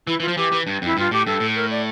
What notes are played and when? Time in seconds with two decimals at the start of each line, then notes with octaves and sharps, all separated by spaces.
0.07 E3 E4
0.20 E3 F4
0.28 F3
0.37 E3 G4
0.52 E3
0.67 G2
0.82 F2 E4
0.97 G2 F4
1.11 A2 G4
1.26 G2 A4
1.40 A2
1.56 A#4
1.71 D5